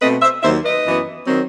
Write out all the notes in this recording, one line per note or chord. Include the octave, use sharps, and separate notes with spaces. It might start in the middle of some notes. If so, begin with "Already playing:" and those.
B2 A3 C4 B4 D#5
C5 E5
D#2 D#3 F#3 C5 E5
B4 D#5
F#2 E3 B3
D#3 F#3 C4